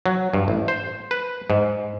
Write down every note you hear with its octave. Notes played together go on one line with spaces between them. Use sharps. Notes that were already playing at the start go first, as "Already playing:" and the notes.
F#3
G2
A1
C5
B4
G#2